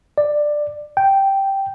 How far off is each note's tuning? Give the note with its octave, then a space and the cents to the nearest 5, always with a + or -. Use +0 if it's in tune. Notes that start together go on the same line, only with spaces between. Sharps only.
D5 +10
G5 -5